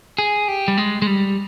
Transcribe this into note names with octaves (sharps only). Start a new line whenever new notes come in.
G#4
G4
G3
G#3
G#3
G3